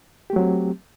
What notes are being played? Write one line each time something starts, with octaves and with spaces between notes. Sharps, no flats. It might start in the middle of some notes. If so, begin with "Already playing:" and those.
F#3 A3 C4 G4